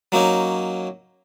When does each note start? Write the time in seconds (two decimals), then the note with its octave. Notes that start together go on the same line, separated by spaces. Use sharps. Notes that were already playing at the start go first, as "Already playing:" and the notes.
0.12 F#3 A#3 C#4 D#4